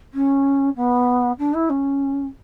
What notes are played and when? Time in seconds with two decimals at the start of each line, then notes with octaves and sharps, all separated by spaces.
0.13 C#4
0.76 B3
1.38 D4
1.54 E4
1.69 C#4